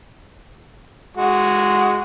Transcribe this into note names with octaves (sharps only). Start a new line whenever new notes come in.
G#3 F#4